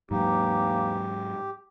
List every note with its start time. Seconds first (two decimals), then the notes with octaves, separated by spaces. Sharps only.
0.11 D#2 G#2 E3 F#3 A#3 D#4 G4